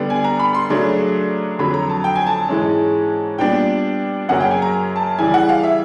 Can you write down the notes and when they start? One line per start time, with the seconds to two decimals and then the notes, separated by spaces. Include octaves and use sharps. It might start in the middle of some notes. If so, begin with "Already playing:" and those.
Already playing: D3 G3 B3 D4
0.10 G#5
0.24 A#5
0.39 B5
0.55 C6
0.69 C#3 F#3 A3 D4
1.59 F2 D3 F#3 B5
1.74 A#5
1.89 A5
2.04 G5
2.16 G#5
2.27 A5
2.49 G#2 E3 G#3 C#4
3.38 A#2 G3 B3 D4 G5
4.29 F#2 C#3 F#3 A#3 C#4 F#5
4.40 G5
4.51 G#5
4.62 A#5
4.96 A5
5.19 C#3 E3 G3 G#5
5.34 F#5
5.49 F5
5.64 E5